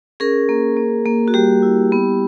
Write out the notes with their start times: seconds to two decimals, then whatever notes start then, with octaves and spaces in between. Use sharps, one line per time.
0.20 C#4 G#4 A#4
0.49 A#3
0.77 A#3
1.06 A#3
1.28 F#4
1.34 G3 G4
1.63 E4
1.92 B3